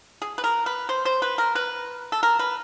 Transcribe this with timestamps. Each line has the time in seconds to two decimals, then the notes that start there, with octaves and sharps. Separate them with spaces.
0.22 G#4
0.38 B4
0.44 A#4
0.66 B4
0.89 C5
1.05 C5
1.22 B4
1.38 A#4
1.55 B4
2.12 A4
2.23 A#4
2.39 B4